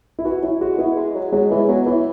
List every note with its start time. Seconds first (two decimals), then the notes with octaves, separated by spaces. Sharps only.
0.19 E4
0.25 E3 F#4
0.42 F#3 E4
0.61 G#3 F#4
0.78 B3 E4
0.96 G#3
1.15 F#3
1.32 F#3 G#3
1.51 E3 G#3
1.68 F#3 B3
1.86 E3 E4